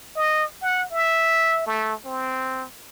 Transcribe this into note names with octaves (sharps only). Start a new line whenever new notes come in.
D#5
F#5
E5
A3
C4